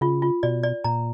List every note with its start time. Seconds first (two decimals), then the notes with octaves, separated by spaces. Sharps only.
0.01 C#3 F4
0.22 F4
0.43 B2 D5
0.63 D5
0.84 A#2 A#5